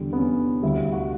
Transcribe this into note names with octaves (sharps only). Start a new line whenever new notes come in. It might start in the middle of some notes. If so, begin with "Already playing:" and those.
Already playing: E2 D3 G3
B3
C#4
D2 D3 G3 E4
E4
F#4